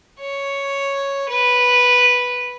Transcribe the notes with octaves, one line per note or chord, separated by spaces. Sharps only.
C#5
B4